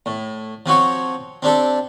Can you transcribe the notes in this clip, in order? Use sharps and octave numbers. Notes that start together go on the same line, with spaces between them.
A2
F3 C4 F#4 C#5
C4 D4 G4 A4